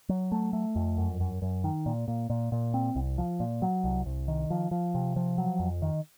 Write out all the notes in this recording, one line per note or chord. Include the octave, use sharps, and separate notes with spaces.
F#3
A3
A3
F2
F#2
F#2
F#2
D#3
A#2
A#2
A#2
A#2
C4
C2
F3
A#2
F#3
C2
C2
D#3
F3
F3
C3
F3
F#3
F2
D#3